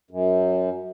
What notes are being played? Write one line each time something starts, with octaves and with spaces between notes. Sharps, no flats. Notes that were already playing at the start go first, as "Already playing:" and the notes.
F#2